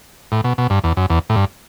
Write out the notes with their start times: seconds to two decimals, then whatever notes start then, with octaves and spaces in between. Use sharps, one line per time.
0.32 A2
0.44 B2
0.58 B2
0.70 G2
0.84 E2
0.97 F#2
1.10 E2
1.30 A2
1.36 G2